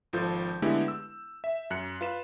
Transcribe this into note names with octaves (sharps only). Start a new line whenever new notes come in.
G#1 F3 F4 A4 G6
D3 G#3 A3 B3 E4 G4
E6
E5
F#2 F#6 C#7
F4 B4 E7